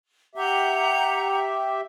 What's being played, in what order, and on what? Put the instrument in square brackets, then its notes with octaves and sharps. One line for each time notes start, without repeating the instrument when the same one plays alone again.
[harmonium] G4 E5 [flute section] F#5 A#5 G6